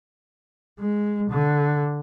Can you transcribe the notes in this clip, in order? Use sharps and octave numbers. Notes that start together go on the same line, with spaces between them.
G#3
D3